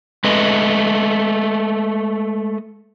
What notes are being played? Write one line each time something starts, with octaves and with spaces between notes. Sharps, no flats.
G#3 A3 B4 D#5